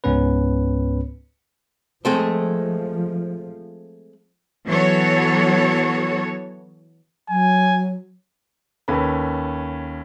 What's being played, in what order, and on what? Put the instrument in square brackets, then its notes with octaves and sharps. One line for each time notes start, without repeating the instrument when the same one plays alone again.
[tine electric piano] C#2 G#2 B3 C#4 B4
[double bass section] F3 [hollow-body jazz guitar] G#3 A3 C4
[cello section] E3 F#3 B3 F#4 A4 C#5
[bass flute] F#3 [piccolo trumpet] G#5
[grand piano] D#2 C#4 A4 B4 B5